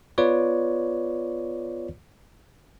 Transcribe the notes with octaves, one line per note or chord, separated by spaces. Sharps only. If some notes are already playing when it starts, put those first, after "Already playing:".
B3 F4 B4 C#5 D5